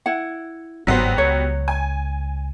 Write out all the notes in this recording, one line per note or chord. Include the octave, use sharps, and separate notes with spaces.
E4 F#5
G1 G#2 F#3 G3 B3 F#4 C5
C#2 C#5
G#5